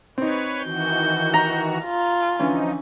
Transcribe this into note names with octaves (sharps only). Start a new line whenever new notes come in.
C4 D#4 B4 C#5
D#3 E3 F#4 G6
A#5
F4
D3 E3 F3 C#4 D#4